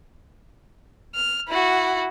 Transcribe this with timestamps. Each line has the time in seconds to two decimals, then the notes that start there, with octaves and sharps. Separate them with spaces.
1.15 F6
1.49 E4 F#4